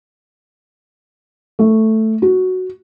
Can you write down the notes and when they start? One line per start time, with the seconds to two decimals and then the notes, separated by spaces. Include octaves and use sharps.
1.59 A3
2.22 F#4